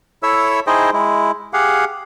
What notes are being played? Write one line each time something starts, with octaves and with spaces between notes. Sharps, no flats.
E4 A4 C#5 E5 E6
D#4 E4 G#4 C5 D#5 G5
G#3 E4
G4 G#4 F5 F#5